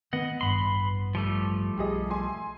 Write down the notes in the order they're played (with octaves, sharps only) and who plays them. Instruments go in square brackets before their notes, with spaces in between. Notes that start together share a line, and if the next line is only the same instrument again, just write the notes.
[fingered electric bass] D#3 [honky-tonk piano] B3 [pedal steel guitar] D#5 F#5
[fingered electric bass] A1 G2 [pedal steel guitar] B5 C6
[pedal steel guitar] F3 G3 A3
[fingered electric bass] B1 [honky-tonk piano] G4 G#4 D#5
[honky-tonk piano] G#5 C6